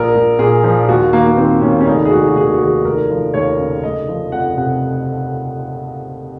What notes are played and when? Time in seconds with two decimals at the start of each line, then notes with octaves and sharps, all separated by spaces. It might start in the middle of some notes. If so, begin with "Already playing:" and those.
Already playing: A#1 A#4
0.15 A#1
0.39 A#2 G#4
0.64 F3
0.88 D#2 F#4
1.13 D#3 A#3
1.27 A#3
1.37 D#3 C4
1.62 D#2 C#4
1.81 C#4
1.87 F1 D#4
2.05 G#4
2.11 F1 F#4
2.28 F#4
2.36 D#2 G#4
2.54 F#4
2.60 D#3 G#4
2.85 F1 A#4
3.10 F3
3.34 D#2 C#5
3.59 C#3
3.83 F1 D#5
4.08 F3
4.32 F2 F#5
4.57 C3 F#5